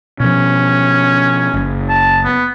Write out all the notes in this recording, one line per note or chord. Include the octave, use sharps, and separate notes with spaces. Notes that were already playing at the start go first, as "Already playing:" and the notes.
B2 F3 C#4
F#1
A5
B3